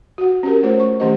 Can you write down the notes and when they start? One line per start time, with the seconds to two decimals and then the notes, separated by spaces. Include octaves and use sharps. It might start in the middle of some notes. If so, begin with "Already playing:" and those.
0.18 F#4 F#5
0.43 C#4 G4 A#4
0.63 A3 F4 C5 C#5
0.80 C#6
1.00 D#3 A3 C#4 G4 C5 D#5